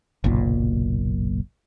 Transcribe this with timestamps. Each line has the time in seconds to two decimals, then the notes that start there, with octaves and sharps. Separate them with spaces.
0.24 F#1 B1 A#2